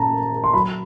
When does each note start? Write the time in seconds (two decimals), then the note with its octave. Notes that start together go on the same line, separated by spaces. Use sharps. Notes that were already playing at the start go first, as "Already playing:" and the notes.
Already playing: A#2 C#4 A5 A#5
0.14 A#3
0.33 A#3
0.44 C6
0.54 F#3 B5